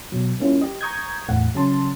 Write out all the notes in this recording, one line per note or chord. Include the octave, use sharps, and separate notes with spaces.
B2 F#3
G3 A#3 C#4 E4 F4
G4 D#5
A#5 C#6 D#6 G6 G#6
E2 A2 A3 F5 F#5
C#3 F#3 C#4 A5 C6